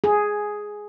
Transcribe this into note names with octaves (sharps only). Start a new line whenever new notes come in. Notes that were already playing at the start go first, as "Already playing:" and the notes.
G#4